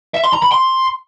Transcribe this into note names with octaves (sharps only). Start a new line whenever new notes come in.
E5
C6
A#5
B5
C6